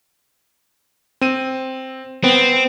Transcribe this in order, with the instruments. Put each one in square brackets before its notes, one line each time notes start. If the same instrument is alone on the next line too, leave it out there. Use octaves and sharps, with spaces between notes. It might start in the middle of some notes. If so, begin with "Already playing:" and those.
[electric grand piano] C4 D#7
[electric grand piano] B3 [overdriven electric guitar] C4